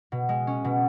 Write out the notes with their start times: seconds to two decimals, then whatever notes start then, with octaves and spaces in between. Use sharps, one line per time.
0.12 B2
0.29 G#3
0.47 C#4
0.65 B2